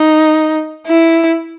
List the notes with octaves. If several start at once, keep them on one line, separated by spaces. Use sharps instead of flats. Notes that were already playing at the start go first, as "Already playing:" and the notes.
Already playing: D#4
E4